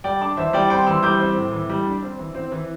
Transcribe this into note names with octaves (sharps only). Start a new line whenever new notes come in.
G3 D5 G5
D4 A5 D6
E3 C5 E5
G3 D5 G5
C4 G5 C6
E3 C6 E6
G3 D6 G6
C4
A2
E3
G3
D4
C4
E3
C4
E3